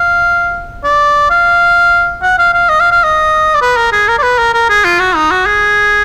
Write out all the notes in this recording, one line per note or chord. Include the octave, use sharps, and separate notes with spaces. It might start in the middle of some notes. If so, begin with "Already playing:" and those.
Already playing: F5
D5
F5
F#5
F5
F5
D#5
F5
F5
D#5
D5
B4
A#4
G#4
A#4
D5
B4
A#4
A#4
G#4
F4
F#4
D#4
F#4
G#4